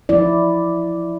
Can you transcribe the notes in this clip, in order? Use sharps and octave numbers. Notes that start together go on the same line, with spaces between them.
F3 E4 D5